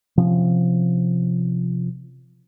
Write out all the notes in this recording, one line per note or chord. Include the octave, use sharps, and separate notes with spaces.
C3 F3 C#4